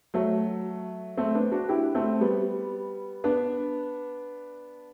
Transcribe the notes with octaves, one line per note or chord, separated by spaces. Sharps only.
F#3 A3
A3 C4
B3 D4
D4 F#4
E4 G4
A3 C4
G3 B3
B3 D4